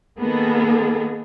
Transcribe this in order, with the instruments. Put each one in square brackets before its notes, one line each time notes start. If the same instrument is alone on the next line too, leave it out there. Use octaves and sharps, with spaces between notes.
[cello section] D#3 A#3 B3 G#4 A4